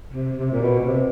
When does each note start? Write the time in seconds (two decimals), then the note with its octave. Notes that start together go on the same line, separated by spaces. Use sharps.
0.13 C3
0.37 C3
0.51 A#2
0.62 B2
0.86 C3